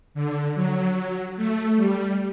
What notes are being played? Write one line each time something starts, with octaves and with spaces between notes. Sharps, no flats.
D3
F#3
A3
G3